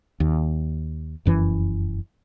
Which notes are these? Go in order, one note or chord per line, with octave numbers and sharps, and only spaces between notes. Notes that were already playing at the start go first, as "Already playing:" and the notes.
D#2
F1 F#2 E3